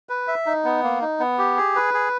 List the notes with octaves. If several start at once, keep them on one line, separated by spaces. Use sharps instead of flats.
B4
E5
D#4
B3
A#3
D#4
B3
G4
G#4
B4
G#4